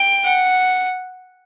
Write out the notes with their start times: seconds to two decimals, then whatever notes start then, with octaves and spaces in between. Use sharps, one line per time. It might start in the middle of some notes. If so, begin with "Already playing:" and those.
Already playing: G5
0.24 F#5